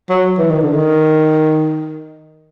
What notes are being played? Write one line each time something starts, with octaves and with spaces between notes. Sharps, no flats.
F#3
E3
D#3
D3
D#3